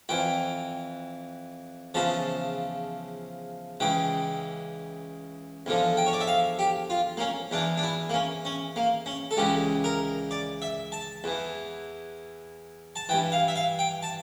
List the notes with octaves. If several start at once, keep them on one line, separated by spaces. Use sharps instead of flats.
F2 E3 G5
E2 C#3 F3 A5
C#2 C#3 E3 G5
E2 D3 F3
G5
C#5
D5
E5
F5
G4
F4
A#3
C#4
E2 E3 D4
D4
E4
A#3
C#4
C#4
A#3
C#4
A4
C#2 C#3 E3 G4
A#4
D5
E5
A5
E2 E3
A5
G2 E3 G5
F5
E5
F5
G5
A5